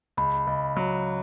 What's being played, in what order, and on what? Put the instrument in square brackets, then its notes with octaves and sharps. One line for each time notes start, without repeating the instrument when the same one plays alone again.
[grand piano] C#2 [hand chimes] B5
[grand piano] C#2
F#3